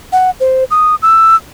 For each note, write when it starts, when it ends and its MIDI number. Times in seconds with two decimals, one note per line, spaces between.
0.12 0.31 78
0.40 0.64 72
0.71 0.95 87
1.02 1.36 88